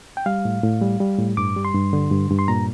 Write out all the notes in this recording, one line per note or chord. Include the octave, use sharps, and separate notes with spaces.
G5
G3 F5
A2
A2
G3
G3
A2
G2 D6
G3
C6
G2
D3
G2
G2
C6
A#2 A#5